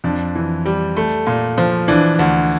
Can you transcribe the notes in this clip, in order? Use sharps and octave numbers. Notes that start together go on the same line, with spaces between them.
F2 D4
E3
G3
A3
A#2
F3
E3 D4
D2